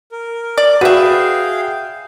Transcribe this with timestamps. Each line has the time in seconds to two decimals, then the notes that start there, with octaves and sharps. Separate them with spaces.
0.12 A#4
0.58 D5
0.81 F#4 G#4 B4 E5 F5 G5